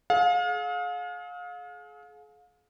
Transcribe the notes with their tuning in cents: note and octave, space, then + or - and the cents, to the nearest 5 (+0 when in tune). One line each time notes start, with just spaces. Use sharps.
G#4 +40 F5 +35